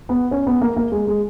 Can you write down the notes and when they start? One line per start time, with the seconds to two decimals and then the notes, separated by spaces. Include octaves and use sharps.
0.09 B3
0.31 C#4
0.47 B3
0.61 A#3
0.77 A#3
0.92 G#3
1.07 G#3